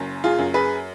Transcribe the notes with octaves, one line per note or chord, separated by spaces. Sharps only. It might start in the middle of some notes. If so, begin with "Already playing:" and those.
Already playing: F#1 F#2
F4 G#4
F#2
G#4 B4